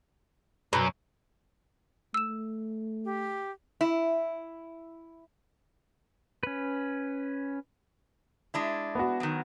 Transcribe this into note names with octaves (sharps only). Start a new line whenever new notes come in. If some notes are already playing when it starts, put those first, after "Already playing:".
F#2 B2
A3 E6 E7
G4
E4
C#4 B4
G#3 D4 E4
B3 F#4
D#3 F#3